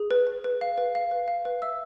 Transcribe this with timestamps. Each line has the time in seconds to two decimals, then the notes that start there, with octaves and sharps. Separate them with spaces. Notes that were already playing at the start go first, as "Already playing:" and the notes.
Already playing: G#4
0.11 B4
0.27 B4
0.44 B4
0.61 F5
0.78 B4
0.95 F5
1.11 B4
1.28 F5
1.45 B4
1.62 E5 E6